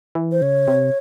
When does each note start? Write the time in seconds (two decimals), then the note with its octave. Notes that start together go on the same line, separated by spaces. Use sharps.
0.15 E3
0.32 C5
0.42 C#3 C#5
0.68 C3